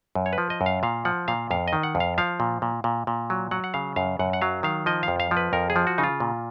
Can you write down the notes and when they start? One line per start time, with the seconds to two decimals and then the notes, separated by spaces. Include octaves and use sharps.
0.15 F#2
0.26 C#5
0.33 B4
0.38 F3
0.50 D#5
0.61 F#2
0.66 F5
0.83 A#2 F5
1.05 F3 F#5
1.28 A#2 F5
1.51 F2 F5
1.68 D#5
1.73 D#3
1.83 F#5
1.95 F2
2.00 F5
2.18 F3 F5
2.40 A#2
2.62 A#2
2.84 A#2
3.07 A#2
3.30 F#3
3.51 F#3 F#5
3.64 F#5
3.74 C#3 F5
3.96 F#2 F5
4.19 F#2 F#5
4.33 F#5
4.41 F#3 F5
4.63 D#3 F5
4.86 F3 D#5
5.03 F5
5.08 F2
5.20 F5
5.31 F3
5.37 B4
5.53 F2 A#4
5.70 G#4
5.76 F3
5.87 F#4
5.98 C#3 D#4
6.04 F4
6.20 A#2